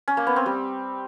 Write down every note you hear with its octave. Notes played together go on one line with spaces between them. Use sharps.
C#4
A#3
B3
C4
G3